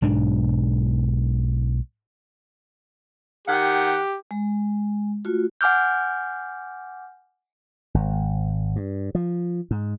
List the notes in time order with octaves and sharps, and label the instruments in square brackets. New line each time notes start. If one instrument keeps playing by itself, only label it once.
[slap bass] B1 G#2 D4
[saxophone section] D#3 F#5 [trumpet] G4
[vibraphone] G#3
A3 F4 F#4
[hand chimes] F#5 G#5 D6 F6 G6
[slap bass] G#1
G2
F3
G#2